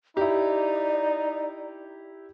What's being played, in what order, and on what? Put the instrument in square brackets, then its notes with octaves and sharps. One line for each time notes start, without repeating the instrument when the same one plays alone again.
[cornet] D#4 [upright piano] E4 G4 [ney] D5